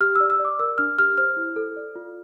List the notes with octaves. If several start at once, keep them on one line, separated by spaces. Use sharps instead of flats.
G4 F6
D5 E6
E6
D5
D6
A#4 E6
D4 F6
G4 F6
C5 F6
E4
A4
D5
F4